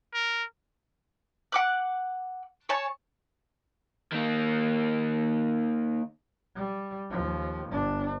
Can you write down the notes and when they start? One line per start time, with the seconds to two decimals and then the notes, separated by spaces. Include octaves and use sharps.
0.14 A#4
1.52 F#5 D6 F#6
2.69 C#5 G#5 A5 C#6
4.12 D#3 A#3
6.55 G3
7.10 D#2 F3
7.69 G1 D4